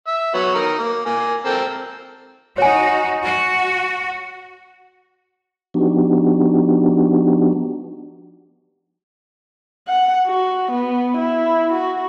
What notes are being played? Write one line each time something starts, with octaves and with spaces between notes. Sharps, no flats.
E5
F#3 B3 C#5
D#4 A#4
A#3
A#3 G#5
C4 A4 A#4
D#4 F#4 C#5 G#5
F#4
F3 B3 D4 D#4 F#4 G4
F#5
F#4
B3
E4
F#4